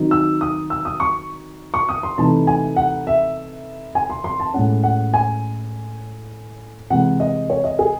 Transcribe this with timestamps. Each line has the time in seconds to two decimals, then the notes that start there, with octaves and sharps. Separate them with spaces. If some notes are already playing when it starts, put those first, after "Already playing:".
Already playing: D#3 F#3 C4 D#4
0.11 E6
0.41 D#6
0.70 E6
0.85 D#6
1.00 C#6
1.74 C#6
1.89 D#6
2.03 C6
2.18 C3 E3 A3 D#4 A5
2.47 G#5
2.76 F#5
3.07 E5
3.95 G#5
4.10 C6
4.24 C6
4.40 A5
4.54 A2 G#3 C#4 F#5
4.84 F#5
5.14 G#5
6.90 C3 E3 G#3 F#5
7.20 D#5
7.50 C#5
7.64 D#5
7.79 G#4